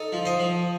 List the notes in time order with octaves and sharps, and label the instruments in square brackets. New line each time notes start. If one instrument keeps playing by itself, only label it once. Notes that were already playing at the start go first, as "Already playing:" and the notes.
Already playing: [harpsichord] D#4 A4
F3
C5 D#5
F3